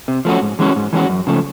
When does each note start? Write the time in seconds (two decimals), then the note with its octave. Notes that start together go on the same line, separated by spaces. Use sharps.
0.08 C3
0.25 F3 A3 C#4 F#4
0.42 G#2
0.59 E3 G#3 C#4 F#4
0.76 G#2
0.93 E3 G#3 C#4 F#4
1.09 F#2
1.27 C#3 F3 A3